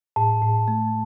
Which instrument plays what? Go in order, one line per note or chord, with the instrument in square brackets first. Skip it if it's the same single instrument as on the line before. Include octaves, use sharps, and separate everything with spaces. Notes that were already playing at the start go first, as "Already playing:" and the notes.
[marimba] A2 [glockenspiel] A5
[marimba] A2
A3